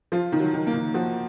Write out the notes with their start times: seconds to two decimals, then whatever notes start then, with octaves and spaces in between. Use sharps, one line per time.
0.12 F3 F4
0.32 D#3
0.39 F#3
0.54 D#3
0.67 A#3
0.73 D#3
0.94 F3 F#4